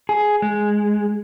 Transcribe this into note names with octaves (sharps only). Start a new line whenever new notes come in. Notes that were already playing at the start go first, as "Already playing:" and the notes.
G#4
G#3